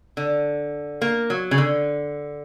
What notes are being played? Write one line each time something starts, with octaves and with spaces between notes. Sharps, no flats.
D3
A#3
F#3
C#3
D3